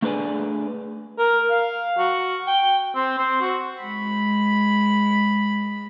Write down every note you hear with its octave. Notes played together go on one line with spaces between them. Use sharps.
A3 D4 G#4 B4 D5 G#5
A#4
F5
F#4
G5
C4
C4
F#4
G#3 B5